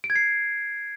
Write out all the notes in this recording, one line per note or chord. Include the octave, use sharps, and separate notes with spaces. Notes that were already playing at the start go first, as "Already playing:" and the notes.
D7
G#6
C7